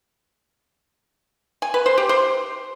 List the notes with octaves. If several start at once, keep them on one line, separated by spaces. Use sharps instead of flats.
G#5
B4
C5
G4
C5